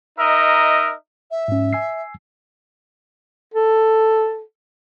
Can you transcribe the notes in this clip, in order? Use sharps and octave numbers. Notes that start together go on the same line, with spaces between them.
D#4 A#4 D#5 E5
E5
G#2 C#4
G#5 E6 C7
A4